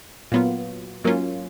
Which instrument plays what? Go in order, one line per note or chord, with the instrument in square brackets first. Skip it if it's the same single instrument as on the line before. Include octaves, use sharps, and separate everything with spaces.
[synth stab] A#2 F#3 B3 F4
G#2 F#3 A#3 C#4 F4